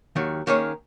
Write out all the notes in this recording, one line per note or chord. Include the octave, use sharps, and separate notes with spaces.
D#2 D#3 F#3
D#3 A#3 C#4 G#4 C#5